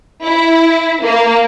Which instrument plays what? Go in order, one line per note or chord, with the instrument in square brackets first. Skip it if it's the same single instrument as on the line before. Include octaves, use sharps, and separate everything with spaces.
[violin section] E4
A#3